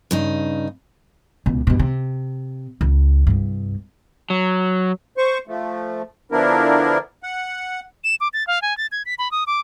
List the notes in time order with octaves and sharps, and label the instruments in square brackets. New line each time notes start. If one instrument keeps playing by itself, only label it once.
[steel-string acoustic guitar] G2 C#3 D#4
[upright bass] C#2 B2
G2 B2
C3
C#2
C2 G2
[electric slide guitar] F#3
[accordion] C5 C#6
F3 A3
D3 F3 B3 D4 E4 A#4
F#5
[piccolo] E7
D6
A6
F5
G#5
A6
G#6
B6
B5
D#6
D6